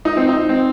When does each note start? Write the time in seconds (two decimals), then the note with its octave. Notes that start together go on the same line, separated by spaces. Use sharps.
0.05 D#4
0.17 C4
0.29 D#4
0.49 C4